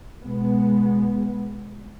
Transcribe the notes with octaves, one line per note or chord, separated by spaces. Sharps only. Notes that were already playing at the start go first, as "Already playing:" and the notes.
B2 G#3 B3